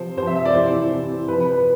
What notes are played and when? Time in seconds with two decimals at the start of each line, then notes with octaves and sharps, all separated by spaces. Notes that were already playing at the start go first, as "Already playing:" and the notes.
Already playing: C3 F3 C5
0.17 C3 C5
0.22 F3 E5
0.36 E5
0.45 D5
0.54 C3 E3 C5
0.91 C3 E3
1.28 C3 B4
1.32 F3
1.40 B4
1.53 B4